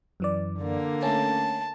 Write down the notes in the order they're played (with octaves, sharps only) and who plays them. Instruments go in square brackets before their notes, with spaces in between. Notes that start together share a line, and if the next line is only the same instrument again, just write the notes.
[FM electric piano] F#2 E3 D5
[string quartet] D3 A#3
[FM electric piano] A3 C#4 [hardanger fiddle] A5